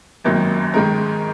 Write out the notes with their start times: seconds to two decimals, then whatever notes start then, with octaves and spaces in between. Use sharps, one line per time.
0.24 G#1 F#2 D#3 F#3 A#3
0.74 G#2 D#3 G#3 D#4 A#4